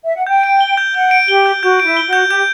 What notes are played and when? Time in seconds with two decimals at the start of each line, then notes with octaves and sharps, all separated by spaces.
0.05 E5
0.16 F#5
0.27 G5 G6
0.43 D7
0.61 G7
0.77 G6
0.94 F#5 G6
1.11 D7
1.28 G4 G7
1.46 G6
1.62 F#4 G6
1.80 E4 D7
1.97 G7
2.08 F#4 G6
2.30 G4 G6